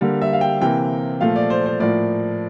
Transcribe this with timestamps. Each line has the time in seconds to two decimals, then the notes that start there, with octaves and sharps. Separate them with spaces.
0.01 D3 G3 A#3
0.21 E5
0.33 F5
0.41 G5
0.61 C3 E3 A#3 G5
1.21 A#2 F3 A3 F5
1.36 D5
1.50 C5
1.66 C5
1.80 A2 F3 A#3 D5